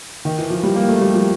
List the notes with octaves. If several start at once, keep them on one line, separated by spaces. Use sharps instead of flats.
D#3
E3
F3
G3
A#3
A3
G3
F3